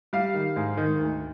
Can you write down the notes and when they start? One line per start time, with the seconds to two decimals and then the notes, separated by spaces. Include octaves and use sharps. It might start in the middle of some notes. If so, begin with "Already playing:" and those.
0.13 G3 F5
0.34 D#3
0.56 G#2
0.77 D#3
0.99 D2